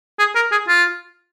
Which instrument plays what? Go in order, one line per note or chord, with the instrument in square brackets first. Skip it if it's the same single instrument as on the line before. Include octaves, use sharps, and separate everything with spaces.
[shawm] G#4
A#4
G#4
F4